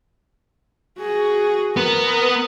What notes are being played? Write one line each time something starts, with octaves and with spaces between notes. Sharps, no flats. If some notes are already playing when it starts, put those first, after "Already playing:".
F#4 G#4
B3 A#4